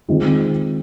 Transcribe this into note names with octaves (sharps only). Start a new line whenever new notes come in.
D#3 G#3 C4 F4